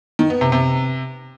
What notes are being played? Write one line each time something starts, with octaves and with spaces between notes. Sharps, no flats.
D#3
B3
C3
C3